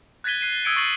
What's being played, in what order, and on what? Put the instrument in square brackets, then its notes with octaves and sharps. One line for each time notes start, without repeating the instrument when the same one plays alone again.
[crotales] F#6 G#6 A6 B6 D#7 G7
F#6 C7 D#7
G7
D#6 E6 G#6 C#7 D7
C#6 A6 C7 F#7 G7